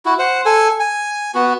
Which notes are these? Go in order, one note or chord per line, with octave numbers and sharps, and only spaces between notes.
E4 F#4
C5 F#5
A4 G#5
G#5
B3 F#4